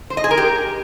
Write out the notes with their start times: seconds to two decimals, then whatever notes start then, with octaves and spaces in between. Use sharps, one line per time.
0.10 C5
0.17 D#5
0.24 G#4
0.31 A#4
0.38 G4